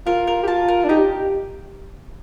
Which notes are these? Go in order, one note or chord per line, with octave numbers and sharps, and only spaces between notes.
F4 A#4
A#4
G4
F4 A5
A#4
D4
D#4 G4